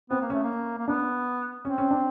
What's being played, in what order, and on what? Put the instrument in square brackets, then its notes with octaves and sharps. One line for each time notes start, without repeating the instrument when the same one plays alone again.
[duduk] B3 [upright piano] C4
[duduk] A#3
[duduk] A3 [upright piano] C#4
[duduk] A#3
A#3
[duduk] B3 [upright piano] D4
[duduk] C4 [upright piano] C#4
[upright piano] C#4
D4